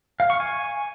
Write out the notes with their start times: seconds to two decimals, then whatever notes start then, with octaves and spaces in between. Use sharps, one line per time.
0.20 F5
0.30 C#6
0.40 G#5